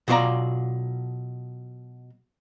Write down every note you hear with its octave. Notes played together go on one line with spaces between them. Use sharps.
B2 F#3 F4 C#5 D5 A#5